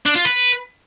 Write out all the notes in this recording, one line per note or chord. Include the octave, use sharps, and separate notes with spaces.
D4
F4
B4